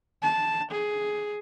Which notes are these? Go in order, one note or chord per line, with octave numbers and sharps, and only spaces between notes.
A5
G#4